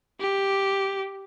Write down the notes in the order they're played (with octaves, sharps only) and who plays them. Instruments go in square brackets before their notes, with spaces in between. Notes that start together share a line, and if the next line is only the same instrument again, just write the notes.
[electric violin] G4